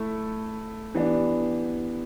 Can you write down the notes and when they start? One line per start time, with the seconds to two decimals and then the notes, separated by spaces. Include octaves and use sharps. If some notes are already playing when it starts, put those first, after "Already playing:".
Already playing: A3 E4 A4
0.95 E3 B3 D4 G4